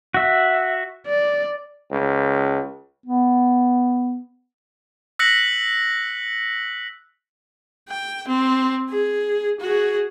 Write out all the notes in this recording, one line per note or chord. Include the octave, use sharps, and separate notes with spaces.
F#4 E5
D5
C#2
B3
E6 F#6 A#6 B6 C#7 F#7
G5
C4
G#4
F#4 G#4